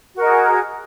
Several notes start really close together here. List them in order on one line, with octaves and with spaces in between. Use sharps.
F#4 A#4 D#5 G#4